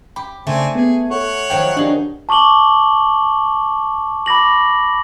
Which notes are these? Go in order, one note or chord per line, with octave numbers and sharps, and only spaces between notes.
G4 B5
C#3 A3 C4 D4 G#5
B3 G#4 G#6
A4 C#5 F#5
D#3 F3 F#3 G5
D4 D#4 G4 G#4
A5 C#6 D6 F#7 G7
B5 D6 A#6 F#7